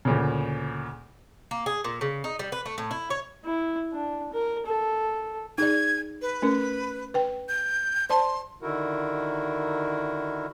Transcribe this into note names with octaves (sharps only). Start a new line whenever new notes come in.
D2 A#2 C#3
A#3
G#4
A#2
C#3
D#4
G3
B4
A3
A2
E4
C#5
E4
D4
A#4
A4
D#4 G#4 D5 G#6
B4
A3 C#4 A#4
B4 G5
G6
C5 D5 A5 C6
D3 D#3 E4 F#4 A#4